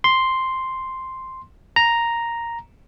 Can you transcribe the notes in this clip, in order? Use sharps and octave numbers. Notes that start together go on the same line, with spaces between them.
C6
A#5